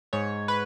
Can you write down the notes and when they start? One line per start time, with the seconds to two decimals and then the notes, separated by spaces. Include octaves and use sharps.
0.13 G#2 C#5
0.48 B4